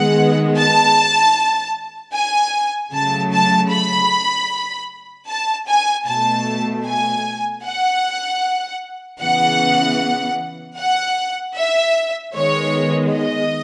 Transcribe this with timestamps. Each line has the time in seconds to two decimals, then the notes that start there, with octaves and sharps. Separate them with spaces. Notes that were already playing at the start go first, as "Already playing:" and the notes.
Already playing: D#3 G#3 B3 F#5
0.57 A5
2.14 G#5
2.92 C#3 F#3 A3 A5
3.32 A5
3.70 B5
5.28 A5
5.67 G#5
6.06 B2 A3 A5
6.85 G#5
7.63 F#5
9.20 C#3 E3 B3 F#5
10.78 F#5
11.56 E5
12.34 D#3 G#3 B3 C#5
13.13 D#5